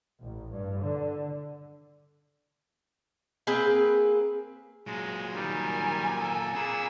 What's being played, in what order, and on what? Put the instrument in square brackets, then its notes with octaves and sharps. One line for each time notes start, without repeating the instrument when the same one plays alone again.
[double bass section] A1
G2
D3
[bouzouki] A#3 C4 G#4 B4
[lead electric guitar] A#2 F#3 [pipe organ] G#3
[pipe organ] D#3 G3 [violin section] A#4 G#5
[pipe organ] A4
[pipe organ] A#2 G#4 E6 [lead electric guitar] C4 B5